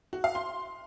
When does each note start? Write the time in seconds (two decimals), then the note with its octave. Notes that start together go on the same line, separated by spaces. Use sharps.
0.13 F#4
0.24 F5
0.35 C6